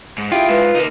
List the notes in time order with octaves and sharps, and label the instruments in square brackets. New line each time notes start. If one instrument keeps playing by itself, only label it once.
[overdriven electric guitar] G#2
[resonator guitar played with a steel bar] E4 G4 G#4 [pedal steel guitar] F4 [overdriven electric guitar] G5
[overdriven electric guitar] G#2 [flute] B4
[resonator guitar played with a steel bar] C3 [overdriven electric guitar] A#3 D#4